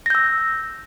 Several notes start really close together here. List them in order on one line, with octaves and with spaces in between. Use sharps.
A#6 G6 E6